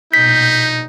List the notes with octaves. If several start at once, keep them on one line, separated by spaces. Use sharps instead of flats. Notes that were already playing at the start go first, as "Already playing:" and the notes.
A#1 B2 D#4 G6 B6